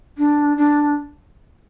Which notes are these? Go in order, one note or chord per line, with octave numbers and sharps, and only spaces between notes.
D4
D4